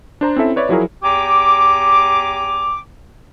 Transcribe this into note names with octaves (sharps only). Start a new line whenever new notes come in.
D4 C5 A#5
C4 C#4 E4 A4 E5
B4 C#5 D5 E5
F3 F#3 E4 F#4 G#4 A#4
E2 G4 G5 G#5 A#5 D6